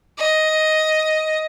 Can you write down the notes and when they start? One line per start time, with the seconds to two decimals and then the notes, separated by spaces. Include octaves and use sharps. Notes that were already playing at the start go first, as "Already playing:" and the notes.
0.18 D#5